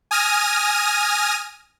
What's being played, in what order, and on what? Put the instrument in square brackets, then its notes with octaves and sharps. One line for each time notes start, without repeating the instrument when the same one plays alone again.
[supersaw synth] G#5 D#6 F6 A#6 D#7